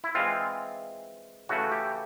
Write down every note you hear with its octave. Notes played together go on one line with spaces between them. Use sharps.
E4
E3 G#3 C4 F4
C#3 E3 A3 F#4
G4